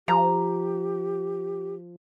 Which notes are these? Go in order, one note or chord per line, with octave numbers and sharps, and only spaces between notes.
F3 G4 A#5